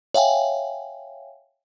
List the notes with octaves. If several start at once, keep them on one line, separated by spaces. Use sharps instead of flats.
C#5 E5 F5 G5 G#5